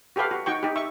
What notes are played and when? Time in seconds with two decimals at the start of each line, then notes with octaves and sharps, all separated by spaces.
0.16 F#4 G4 A4 B4 F5
0.31 F#4
0.46 D#4 F#4 G5 C#6
0.63 D#4 G4
0.76 E5 C#6